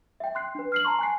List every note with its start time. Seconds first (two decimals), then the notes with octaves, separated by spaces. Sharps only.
0.20 E5 G5
0.35 C6 F#6 C7
0.55 D4 B4
0.72 F6 C7 F#7
0.85 A5 A#5 C6 C#6
0.99 G#5 F#6 C7